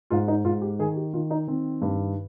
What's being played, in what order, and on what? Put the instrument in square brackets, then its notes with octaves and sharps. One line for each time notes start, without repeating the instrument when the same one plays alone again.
[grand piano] G#2 F4
D#4
G#2 F4
G4
D#3 G#4
G4
D#3 F4
D#4
D#3 C4
G2